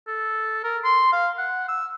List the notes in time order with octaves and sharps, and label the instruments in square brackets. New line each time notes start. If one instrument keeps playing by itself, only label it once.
[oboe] A4
A#4
C6
F5
F#5
E6